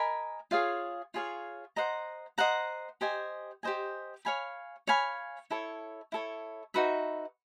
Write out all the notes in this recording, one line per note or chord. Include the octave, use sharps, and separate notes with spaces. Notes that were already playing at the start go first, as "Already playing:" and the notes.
Already playing: A#4 D#5 G#5 B5
F4 G#4 C#5 F5
F4 G#4 C#5 F5
C5 D#5 F#5 A#5
C5 D#5 F#5 A#5
G4 C5 D#5 G#5
G4 C5 D#5 G#5
C#5 F5 G#5 B5
C#5 F5 G#5 B5
E4 A4 C#5
E4 A4 C#5
D#4 F#4 B4 E5